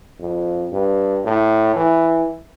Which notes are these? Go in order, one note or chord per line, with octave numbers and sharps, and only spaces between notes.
F2
G2
A2
E3